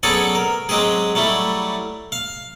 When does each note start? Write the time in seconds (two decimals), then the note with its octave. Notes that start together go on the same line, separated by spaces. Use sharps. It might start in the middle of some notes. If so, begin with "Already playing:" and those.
0.03 F#3 B3 C#4 G#4 A4 D5
0.35 A#4
0.69 F#3 G#3 C4 G4 G#4
1.15 F#3 G3 A3 E4
2.12 F5